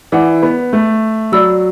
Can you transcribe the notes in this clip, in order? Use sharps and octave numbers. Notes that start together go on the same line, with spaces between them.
E3 D5 F#5 D6
B3
A3
F#3 D5 B5 E6